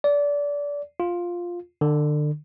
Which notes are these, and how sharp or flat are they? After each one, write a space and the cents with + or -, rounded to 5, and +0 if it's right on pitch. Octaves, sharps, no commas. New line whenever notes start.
D5 -25
F4 +5
D3 +30